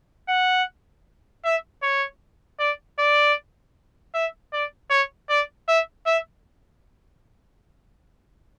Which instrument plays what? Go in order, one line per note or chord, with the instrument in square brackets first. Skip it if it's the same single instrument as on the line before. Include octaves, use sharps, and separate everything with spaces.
[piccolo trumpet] F#5
E5
C#5
D5
D5
E5
D5
C#5
D5
E5
E5